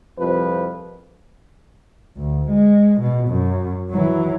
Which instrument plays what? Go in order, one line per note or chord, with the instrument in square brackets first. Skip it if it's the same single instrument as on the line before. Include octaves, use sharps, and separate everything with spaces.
[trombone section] C2 F2 F3 B4
[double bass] D2
G#3
B2
F#2
E3 F#3